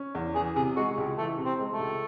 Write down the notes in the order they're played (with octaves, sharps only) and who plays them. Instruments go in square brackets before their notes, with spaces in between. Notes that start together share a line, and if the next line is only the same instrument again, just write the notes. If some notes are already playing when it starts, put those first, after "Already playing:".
Already playing: [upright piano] C#4
E2
[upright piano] E3 [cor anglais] G#4
[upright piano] C3 [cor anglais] G#4
[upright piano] G#3 [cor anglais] F#4
[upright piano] C#2
[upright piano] E3 [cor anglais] A3
[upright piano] C3
[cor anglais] C4
[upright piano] G#3
[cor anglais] A3
[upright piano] C#2